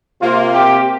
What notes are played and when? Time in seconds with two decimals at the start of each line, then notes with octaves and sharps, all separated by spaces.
0.21 C3 A#3 F4
0.52 G4